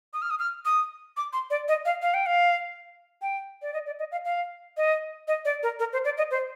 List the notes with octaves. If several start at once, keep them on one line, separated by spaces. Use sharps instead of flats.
D#6
F6
D#6
F6
D#6
D6
C6
D5
D#5
F5
F5
G5
F5
G5
D5
D#5
D5
D#5
F5
F5
D#5
D#5
D5
A#4
A#4
C5
D5
D#5
C5